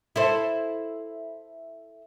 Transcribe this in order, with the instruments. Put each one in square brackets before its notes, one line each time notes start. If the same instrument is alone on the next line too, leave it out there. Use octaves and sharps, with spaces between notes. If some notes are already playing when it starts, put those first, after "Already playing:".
[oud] E4 A4 C5